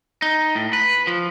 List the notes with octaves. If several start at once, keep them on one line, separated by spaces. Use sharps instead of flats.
D#4
A2
B4
F3